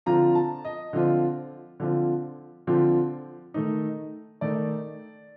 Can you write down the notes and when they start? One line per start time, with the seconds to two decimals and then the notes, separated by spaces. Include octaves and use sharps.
0.06 D3 F3 C4 F4 A#5
0.35 A5
0.65 D#5
0.93 D3 F3 C4 F4
1.80 D3 F3 C4 F4
2.67 D3 F3 C4 F4
3.54 D#3 A3 D#4
4.41 D#3 A3 D#4 D5